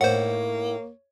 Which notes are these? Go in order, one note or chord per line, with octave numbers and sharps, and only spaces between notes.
A2 A#3 D#4 C5 C#5 F#5